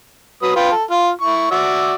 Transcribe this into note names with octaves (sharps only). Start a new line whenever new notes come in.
F#3 B4 D#6
F4 B4 G5
A4
F4
E4 C#6
F#4 D5 E5